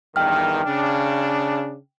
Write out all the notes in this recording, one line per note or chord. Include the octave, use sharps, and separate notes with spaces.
E2 G2 D#3 G5 F6
C#3 D4